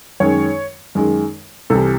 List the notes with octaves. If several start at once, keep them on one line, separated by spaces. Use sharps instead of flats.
F#2 D#3 G#3 C#5
F#2 D#3 G#3
C2 C3 E3 A4